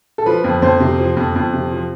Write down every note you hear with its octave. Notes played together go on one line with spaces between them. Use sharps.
A4
F3 B4
F2
F2 C5
C3
F3
F2
F2
C3
F3